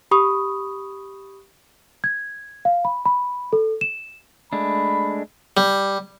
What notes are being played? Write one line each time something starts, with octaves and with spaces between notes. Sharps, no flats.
G4 B5 C#6 D#6
G#6
F5
B5
B5
A4
E7
G#3 A3 D4 B5
G3